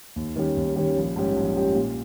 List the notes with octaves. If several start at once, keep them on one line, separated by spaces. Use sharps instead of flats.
D#2
D#3 G3 C#4 G4
D#2
D#3 G3 C#4 G4
A#1
G#2 G3 C#4 G4
A#1
G#2 G3 C#4 G4
A#2